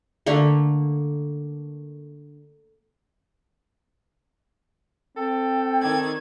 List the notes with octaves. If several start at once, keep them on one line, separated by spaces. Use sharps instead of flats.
D3 A3 A#3
C4 A4 G5
D#3 D5 G#6